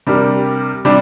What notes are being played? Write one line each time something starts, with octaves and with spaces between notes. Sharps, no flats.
C3 G3 D4 G4 A#4
C3 G3 D4